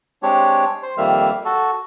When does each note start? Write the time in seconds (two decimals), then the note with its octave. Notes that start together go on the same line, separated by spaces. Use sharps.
0.23 G#3 C4 D4 G4 C#5
0.83 C5
0.98 F2 D#3 G3 A#3 E5 F6
1.45 F#4 A4